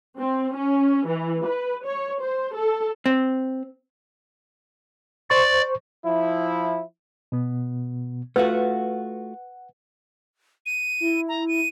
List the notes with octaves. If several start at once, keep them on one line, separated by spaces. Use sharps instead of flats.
C4
C#4
E3
B4
C#5
C5
A4
C4
C5 D5 C#6
F3 E4
B2 B3
A3 F4 F#4 B4 F#5
D#7
E4
A#5
D#7